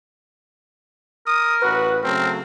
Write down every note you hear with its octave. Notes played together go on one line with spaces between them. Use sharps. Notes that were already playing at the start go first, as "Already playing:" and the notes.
A#4 D#6
A1 F#4 B4
C#3 F#3 A3 C4 A#4